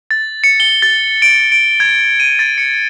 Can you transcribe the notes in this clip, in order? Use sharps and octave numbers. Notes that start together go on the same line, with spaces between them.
A6
C#7
G7
A6
D7
D7
G#6
D#7
A6
C#7